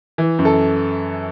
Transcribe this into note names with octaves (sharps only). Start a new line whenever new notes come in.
E3
F#2
A4